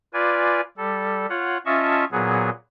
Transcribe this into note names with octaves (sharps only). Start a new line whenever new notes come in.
F4 B4 D5 G#5
G3 A4
F4 C#5 F#5
C#4 F4 D#5 E5 A5 C#6
A#2 F#3 B3 G#4